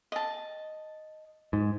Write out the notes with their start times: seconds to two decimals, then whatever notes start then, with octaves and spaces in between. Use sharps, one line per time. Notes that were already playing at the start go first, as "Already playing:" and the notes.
0.12 D#5 A5
1.53 G#2